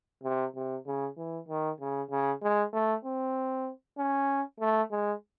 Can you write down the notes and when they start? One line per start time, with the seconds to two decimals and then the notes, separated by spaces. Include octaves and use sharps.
0.24 C3
0.55 C3
0.87 C#3
1.18 E3
1.49 D#3
1.81 C#3
2.11 C#3
2.42 G#3
2.73 A3
3.05 C4
3.98 C#4
4.60 A3
4.91 G#3